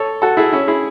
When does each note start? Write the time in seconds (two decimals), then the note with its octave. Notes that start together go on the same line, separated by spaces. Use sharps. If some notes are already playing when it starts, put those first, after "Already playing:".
Already playing: A4 C#5
0.22 F#4 A4
0.37 E4 G#4
0.53 C#4 E4
0.68 E4 G#4